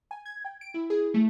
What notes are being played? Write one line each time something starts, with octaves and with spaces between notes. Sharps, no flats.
G#5
G#6
G5
D7
E4
G#4
A3